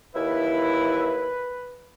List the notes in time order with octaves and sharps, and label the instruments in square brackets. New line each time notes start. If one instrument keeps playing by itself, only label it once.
[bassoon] D#2 [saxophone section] E4 [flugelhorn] B4